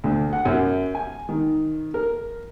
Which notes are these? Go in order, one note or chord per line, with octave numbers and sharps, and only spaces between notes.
D2
F#5
F#2
G#5
D#3
A#4